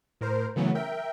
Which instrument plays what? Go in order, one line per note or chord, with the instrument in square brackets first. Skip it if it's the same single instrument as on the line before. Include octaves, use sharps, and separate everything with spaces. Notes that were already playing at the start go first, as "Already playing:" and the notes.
[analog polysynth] A2 A#4 C5
C#3 E3 F#3 A3 B3 C#4
A#4 E5 G5